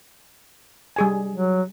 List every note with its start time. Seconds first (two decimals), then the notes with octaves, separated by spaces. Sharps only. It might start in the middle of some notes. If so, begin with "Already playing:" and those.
0.96 G3 G#4 G#5
1.32 F#3